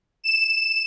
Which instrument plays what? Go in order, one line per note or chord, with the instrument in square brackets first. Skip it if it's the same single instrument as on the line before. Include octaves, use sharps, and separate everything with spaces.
[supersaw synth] E7